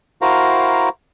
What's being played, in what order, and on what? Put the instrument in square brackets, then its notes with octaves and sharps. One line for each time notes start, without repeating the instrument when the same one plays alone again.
[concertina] E4 F#4 A#4 C5 F5 A#5